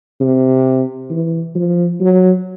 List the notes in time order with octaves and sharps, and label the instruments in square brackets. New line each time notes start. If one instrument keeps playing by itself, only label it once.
[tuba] C3
E3
F3
F#3